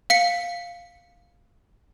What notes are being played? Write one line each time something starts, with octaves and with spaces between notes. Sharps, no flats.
F5 B6 C#7